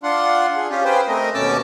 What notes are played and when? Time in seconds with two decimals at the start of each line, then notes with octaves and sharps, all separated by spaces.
0.03 D4 F4 F#5 C6
0.57 G#4
0.70 C#4 F4 G4
0.85 G#4 B4 C5 G5
1.08 A3 C4 A#4 D#5
1.34 D#2 B2 C#4 A5 D6 E6